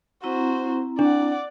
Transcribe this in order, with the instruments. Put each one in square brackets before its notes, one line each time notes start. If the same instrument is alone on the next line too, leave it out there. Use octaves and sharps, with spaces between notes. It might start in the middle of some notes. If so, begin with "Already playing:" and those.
[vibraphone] C4 E4 A#5 [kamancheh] F#4 C5
[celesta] D4 [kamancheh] D5 F#5